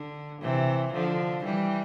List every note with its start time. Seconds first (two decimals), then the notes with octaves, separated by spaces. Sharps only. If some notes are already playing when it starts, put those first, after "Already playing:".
Already playing: D3
0.42 C3 E3
0.93 D3 F3
1.44 E3 G3